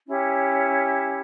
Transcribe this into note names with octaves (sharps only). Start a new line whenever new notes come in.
C#4 E4 G4